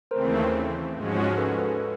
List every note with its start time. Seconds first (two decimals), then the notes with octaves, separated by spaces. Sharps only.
0.11 D#2 C#3 E3 A3 C4 A#4 C5
0.95 G#2 F3 G#3 C#4 F#4
1.37 A4 B4
1.58 A4 B4